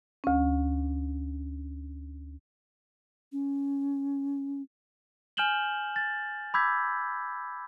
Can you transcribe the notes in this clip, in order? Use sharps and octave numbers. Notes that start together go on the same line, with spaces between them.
D2 C#4
C#4
G#5 F6 G6 E7 F#7 G7
A6
B5 D6 E6 G6 G#6 B6